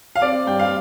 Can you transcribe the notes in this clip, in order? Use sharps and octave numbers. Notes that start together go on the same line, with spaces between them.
F5
C4 D5
G2 G5
F5